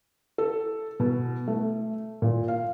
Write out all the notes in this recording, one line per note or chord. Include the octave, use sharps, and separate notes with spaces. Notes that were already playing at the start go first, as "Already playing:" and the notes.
A4
B2
A3
A#2
F5